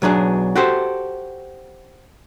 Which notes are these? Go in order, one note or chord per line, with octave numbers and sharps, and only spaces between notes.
B1 F#3 D4 G#4
F#4 G4 A4 C5